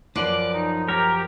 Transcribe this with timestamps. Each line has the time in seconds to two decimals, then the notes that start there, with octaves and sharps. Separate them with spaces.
0.15 F#2 F3 B4 D5 D6 F#6
0.54 D#4
0.89 G4 A#4 C#5